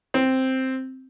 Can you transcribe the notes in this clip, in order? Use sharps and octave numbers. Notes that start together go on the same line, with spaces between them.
C4